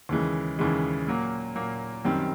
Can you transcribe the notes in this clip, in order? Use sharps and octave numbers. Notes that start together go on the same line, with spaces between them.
D#2 C#3 E3 G#3
D#2 C#3 E3 G#3
A#2 F#3 A#3
A#2 F#3 A#3
F#2 D#3 G3 C4